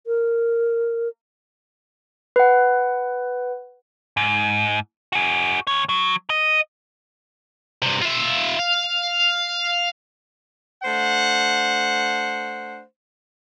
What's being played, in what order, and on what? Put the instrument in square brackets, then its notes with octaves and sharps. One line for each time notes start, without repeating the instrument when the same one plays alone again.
[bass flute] A#4
[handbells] B4 F#5
[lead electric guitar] G#2
F#4 G#4
D2 C#5
F#3
D#5
[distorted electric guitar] G2 C3
F4 E5
F5
[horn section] A3 D4 C5 F#5